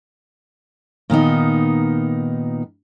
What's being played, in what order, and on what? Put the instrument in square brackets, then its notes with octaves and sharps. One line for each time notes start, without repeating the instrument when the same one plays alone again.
[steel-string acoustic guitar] A#2 D#3 B3 D#4